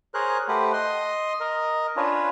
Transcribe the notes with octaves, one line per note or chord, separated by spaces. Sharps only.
G#4 A#4 C5 C#5 F#6
A3 G4 B4 C5 F#5
D#5 C6 D#6
A#4 D#5
C#4 D4 F4 B4 C#5